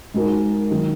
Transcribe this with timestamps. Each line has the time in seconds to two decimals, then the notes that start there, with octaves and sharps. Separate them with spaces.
0.14 G#2 G#3 D#4 F#4 A#4
0.71 D#3 F#3 D#4